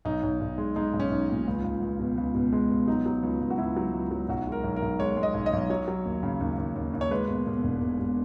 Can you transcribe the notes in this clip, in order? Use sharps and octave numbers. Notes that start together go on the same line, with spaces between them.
B1 D#4
B1
B1
G#3
G#3 D#4
B1
C#4
B1
A#2
C#2
C#2
C#2
B2
C#2
B2
G#3
B2
F#3 D#4
F#3
C#2
C#2
F#4
C#2 E4
F#3
C#2
F#3
B1 F#4
G#3 A#4
B1
A#4
B1
G#3 C#5
G#3
D#5
B1
D#5
B1
F#3 C#5
F#3
D#2
C#3
D#2
D#2
D#2
D#2
C#5
G#3 B4
B2
B2
E1
B2
B2